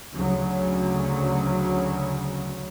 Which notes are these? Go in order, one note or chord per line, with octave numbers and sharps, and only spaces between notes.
D2 C#3 F#3